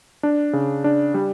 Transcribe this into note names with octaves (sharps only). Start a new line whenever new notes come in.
D4
C#3
D4
G3